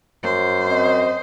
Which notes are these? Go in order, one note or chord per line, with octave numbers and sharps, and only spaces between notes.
F#2 C5
C4 D#5